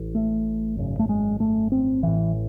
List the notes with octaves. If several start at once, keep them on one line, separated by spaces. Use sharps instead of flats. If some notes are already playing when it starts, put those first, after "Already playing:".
Already playing: A1 A2
A3
G#1 F#2 C#3
A3
G#3
A3
C4
A1 A2 E3